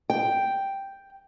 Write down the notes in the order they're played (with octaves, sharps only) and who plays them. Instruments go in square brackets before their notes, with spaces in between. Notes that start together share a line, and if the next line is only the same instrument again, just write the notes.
[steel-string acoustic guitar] G5